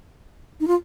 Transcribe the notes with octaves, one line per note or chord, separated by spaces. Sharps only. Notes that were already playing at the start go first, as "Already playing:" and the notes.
D#4
F4